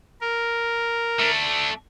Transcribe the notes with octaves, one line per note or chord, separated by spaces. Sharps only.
A#4
A3 D4